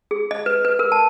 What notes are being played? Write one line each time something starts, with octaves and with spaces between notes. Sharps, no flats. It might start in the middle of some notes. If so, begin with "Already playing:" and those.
G#4
D#5
B4
B4
A#4
A5